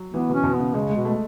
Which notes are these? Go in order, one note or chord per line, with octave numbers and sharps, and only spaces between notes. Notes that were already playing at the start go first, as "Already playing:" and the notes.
Already playing: F#3
E3 B3
B2 C#4
B2
B3
C#3
C#3 G#3
G#3
B2
A3